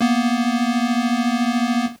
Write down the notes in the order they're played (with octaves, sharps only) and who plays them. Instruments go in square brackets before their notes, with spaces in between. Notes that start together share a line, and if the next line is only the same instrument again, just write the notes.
[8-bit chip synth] A#3 B3